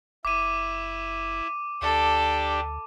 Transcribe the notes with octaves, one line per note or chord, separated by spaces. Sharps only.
F#1 E4 D6 D#7
D2 D4 G4 A4